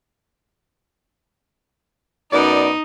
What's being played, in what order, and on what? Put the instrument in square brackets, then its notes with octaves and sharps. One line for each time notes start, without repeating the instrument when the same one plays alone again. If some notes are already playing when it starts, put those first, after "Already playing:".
[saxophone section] F#2 B3 D5 [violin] D#4